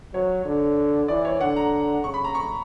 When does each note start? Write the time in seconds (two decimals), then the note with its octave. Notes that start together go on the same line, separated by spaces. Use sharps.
0.14 F#3 C#5
0.45 D3
1.08 E3 D5
1.25 C#5
1.40 D3 F#5
1.56 A#5
2.04 C#3 C#6
2.14 B5
2.24 A#5
2.35 C#6